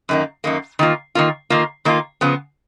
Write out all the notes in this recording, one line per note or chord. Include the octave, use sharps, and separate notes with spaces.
F#2 D#3 A#3
F#2 D#3 A#3
D#3 A#3 F4
D#3 A#3 F4
D#3 A#3 F4
D#3 A#3 F4
C#3 F3 B3